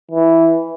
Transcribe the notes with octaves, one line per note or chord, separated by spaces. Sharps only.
E3